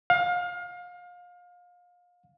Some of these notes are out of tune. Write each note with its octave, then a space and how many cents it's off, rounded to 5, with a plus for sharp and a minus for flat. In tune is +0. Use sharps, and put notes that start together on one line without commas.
F5 +30